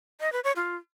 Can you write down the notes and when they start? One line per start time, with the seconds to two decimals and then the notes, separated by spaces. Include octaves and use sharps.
0.21 D#5
0.32 B4
0.44 C#5
0.56 F4